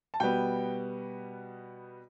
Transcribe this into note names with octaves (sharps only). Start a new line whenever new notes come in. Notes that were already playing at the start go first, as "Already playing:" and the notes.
A5
B2 G3 B3 G5